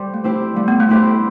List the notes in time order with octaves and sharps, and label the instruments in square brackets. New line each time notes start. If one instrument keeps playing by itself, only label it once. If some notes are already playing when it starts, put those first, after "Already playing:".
Already playing: [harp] G3 G4 C5
[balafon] A3
[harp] C4 E4 G4 C5
[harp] G3 [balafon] A3
[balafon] B3
A3
[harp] C4 E4 G4 C5